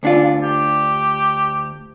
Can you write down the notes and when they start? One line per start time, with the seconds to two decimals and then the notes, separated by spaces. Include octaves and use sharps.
0.03 D2 D4 F4
0.43 G4